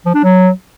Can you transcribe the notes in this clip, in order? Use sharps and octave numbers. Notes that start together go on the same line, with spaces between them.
F3
D4
F#3